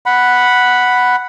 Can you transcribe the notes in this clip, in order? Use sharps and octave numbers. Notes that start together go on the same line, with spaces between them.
F#5 B5